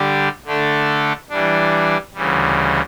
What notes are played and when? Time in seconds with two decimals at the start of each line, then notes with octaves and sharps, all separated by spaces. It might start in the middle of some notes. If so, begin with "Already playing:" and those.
Already playing: D3 G3 D4 G4
0.45 D3 A3 D4 A4
1.30 E3 G3 D4
2.14 D2 C#3 E3 G3